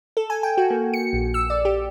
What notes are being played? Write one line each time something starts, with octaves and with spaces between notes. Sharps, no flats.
A4
G#5
G5
F#4
A#3
C#7
A#1
E6
D5
G4